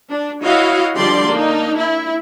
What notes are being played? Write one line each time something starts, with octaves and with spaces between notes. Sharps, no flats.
D4
E4 F#4 C#5 D#5 F5
D3 F3 G3 G4 D5 C6
A#3 D4 D#4
E4